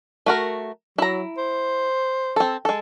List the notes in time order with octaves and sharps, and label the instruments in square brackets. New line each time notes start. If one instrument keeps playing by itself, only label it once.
[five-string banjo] A3 F#4 A#4
[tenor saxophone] F#3 [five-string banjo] E4 A#5
[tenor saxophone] C5
[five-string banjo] C4 A4
G#3 A4